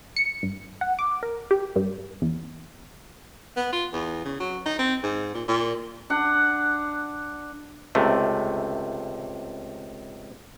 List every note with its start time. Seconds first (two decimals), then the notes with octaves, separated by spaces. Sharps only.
0.16 C#7
0.43 G2
0.81 F#5
0.99 D6
1.23 A#4
1.51 G4
1.76 G2
2.22 E2
3.57 B3
3.72 F4
3.93 E2
4.25 C#3
4.40 F#3
4.66 D#4
4.79 C4
5.03 G#2
5.35 A#2
5.48 A#2
6.10 D4 F#5
7.95 C#2 C3 A3